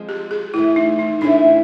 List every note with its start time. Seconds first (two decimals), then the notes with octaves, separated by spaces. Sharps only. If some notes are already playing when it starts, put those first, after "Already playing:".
Already playing: F3 G#3 C4
0.09 G4
0.31 G#4
0.53 A2 E3 A3 E4
0.76 D#4
0.99 D#4
1.21 A2 E3 A3 C#4 D4 E4